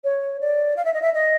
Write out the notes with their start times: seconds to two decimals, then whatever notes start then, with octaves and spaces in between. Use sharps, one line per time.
0.04 C#5
0.40 D5
0.76 F5
0.84 E5
0.93 D#5
1.01 E5
1.13 D#5